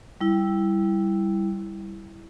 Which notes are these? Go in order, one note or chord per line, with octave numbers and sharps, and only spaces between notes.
G3 E4